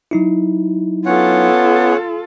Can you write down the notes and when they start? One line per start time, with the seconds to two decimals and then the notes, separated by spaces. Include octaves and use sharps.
0.11 F#3 D#4 E4
1.06 B3 C#4 F4 A4 C#5 F#5